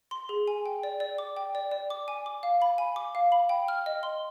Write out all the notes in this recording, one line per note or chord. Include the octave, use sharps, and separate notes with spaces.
C6
G#4
G#5
G5
D5
D5
D6
G5
D5
D5
D6
G#5
D6
F5
B5
G#5
D6
F5
B5
G5
F6
D#5
C6